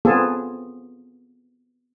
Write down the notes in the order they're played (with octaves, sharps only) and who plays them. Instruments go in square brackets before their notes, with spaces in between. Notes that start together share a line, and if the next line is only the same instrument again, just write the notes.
[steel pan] B3 C4 F4 G#4 A4